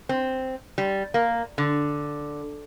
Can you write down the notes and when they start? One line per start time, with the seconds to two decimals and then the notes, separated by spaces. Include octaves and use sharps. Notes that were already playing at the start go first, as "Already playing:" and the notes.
0.09 C4
0.78 G3
1.14 A#3
1.58 D3